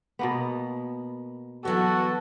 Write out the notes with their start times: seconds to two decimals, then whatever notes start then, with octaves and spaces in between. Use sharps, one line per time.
0.19 B2 A#3 B3
1.65 E3 F#3 B3 F#4 A4